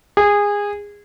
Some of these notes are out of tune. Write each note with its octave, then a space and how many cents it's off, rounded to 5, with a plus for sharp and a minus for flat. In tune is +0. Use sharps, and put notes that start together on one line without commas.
G#4 -20